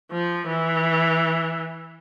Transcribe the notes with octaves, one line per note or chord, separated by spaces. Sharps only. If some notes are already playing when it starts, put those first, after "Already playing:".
F3
E3